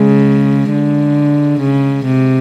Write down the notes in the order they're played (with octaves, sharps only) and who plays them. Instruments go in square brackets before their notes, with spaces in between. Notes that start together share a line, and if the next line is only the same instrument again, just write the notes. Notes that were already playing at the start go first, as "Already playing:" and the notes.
Already playing: [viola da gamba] C#3 [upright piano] G#3
[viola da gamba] D3
C#3
C3